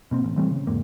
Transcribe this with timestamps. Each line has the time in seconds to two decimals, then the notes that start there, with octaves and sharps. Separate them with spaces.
0.11 B2 A#3 C4
0.24 A1
0.37 E3 G3 A3 C4
0.51 C#3
0.67 E2 G#2 A#3